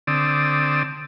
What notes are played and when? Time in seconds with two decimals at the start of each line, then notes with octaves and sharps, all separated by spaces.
0.07 D3 C4 D5 D#6 E6